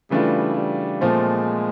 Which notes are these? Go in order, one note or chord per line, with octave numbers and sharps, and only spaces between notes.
C#3 E3 G3 A3 D4 F4
G3
A#2 F3 G#3 A3 C4